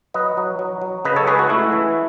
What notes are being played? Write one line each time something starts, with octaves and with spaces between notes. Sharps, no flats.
F#3 B4 D#5
F#3
F#3
F#3
C#3 B4 D#5
A4 C#5
G#3 G#4 B4
F#4
A3 E4
E3